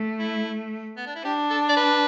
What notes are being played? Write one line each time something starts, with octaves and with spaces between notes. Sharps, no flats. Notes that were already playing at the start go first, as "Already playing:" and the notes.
Already playing: A3
E4
B3
D4
E4
D4 G4
A4
D5
B4